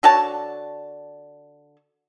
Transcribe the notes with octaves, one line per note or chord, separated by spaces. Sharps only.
D3 F#4 C#5 A5